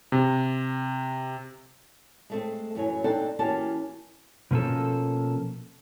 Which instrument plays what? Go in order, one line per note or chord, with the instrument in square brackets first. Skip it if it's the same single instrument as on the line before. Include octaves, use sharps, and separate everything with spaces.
[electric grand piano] C3
[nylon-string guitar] G#3 A3 C4
F#2 E3 F#3 C#5 G#5
C4 D4 D#4 A4 D5 F#5
E3 A#3 C#4 F#4 G4 A5
[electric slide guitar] B2 F3 A#3 C#4 A4